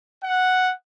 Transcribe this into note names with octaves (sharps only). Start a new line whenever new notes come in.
F#5